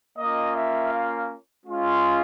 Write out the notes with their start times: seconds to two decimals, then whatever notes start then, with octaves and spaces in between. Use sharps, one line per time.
0.17 A#3 C#4 F4 D#5
0.55 E5
0.91 F5
1.65 G#3 C#4 F4